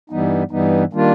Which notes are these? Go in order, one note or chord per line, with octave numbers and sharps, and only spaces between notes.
G2 E3 G3 B3 D#4
G2 E3 G3 B3 D#4
D#3 G3 A#3 D4 F4